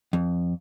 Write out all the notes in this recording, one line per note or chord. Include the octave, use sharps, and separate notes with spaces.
F2